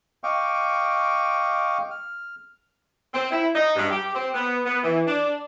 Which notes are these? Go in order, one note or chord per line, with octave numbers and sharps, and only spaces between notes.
D#5 F5 G5 C#6 D6
F6
C4
E4
D#4
G2
G4
C4
B3
B3
E3
D4